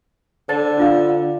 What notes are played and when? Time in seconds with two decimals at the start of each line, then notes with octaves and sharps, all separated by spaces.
0.49 D3 C5 A5 A6
0.77 D4 F4 F5